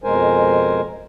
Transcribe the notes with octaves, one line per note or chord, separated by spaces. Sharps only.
F2 B2 G#3 A#4 C5 G#5